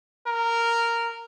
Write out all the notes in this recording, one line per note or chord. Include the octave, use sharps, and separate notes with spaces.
A#4